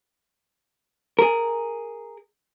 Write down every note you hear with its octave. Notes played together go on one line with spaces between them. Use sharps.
G#4 A#4